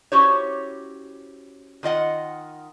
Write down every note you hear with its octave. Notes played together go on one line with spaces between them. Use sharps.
C#4 E4 F#4 G4 C5 C#5
D#3 F4 D#5 F#5